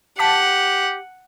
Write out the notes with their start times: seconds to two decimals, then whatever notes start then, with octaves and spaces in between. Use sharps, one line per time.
0.19 G4 F#5 A5 D6 B6